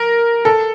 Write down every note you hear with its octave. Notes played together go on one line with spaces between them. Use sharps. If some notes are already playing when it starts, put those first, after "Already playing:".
Already playing: A#4
A4